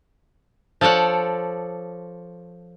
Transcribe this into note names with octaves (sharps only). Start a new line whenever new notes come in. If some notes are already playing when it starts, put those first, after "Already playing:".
F3 A4 C#5 D5 F#5